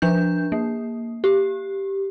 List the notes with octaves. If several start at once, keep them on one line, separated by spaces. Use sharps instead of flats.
F3 D4 G6
A#3
G4